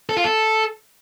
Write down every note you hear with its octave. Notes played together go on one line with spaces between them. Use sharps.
A4
F4
A4